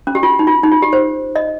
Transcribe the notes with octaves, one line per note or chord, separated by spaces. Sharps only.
C#4
G4
F4
D#4
F4
D#4
F4
G4
C5
D#5